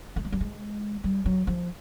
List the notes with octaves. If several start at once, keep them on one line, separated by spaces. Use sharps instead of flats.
A3
G#3
G3
G#3
G3
F#3
F3